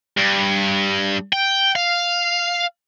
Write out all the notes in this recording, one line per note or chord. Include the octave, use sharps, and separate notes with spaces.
G2
G5
F5